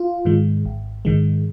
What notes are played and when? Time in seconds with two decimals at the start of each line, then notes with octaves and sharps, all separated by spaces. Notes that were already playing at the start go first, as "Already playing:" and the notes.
Already playing: F4
0.25 G#2 D#3 G#3
0.65 G#1
1.05 G#2 D#3 G#3